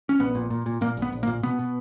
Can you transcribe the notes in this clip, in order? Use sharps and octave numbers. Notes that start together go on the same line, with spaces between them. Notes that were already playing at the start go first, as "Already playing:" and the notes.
C#4
A#1 B3
A#2
A#2
A#2
A#2 A#3
A#1
B3
A#1
A#3
A#2
B2 B3
B2